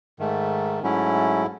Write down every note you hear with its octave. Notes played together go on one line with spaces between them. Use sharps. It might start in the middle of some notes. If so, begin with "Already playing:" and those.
G#2 D#3 A3
G#2 F#3 A3 C#4 E4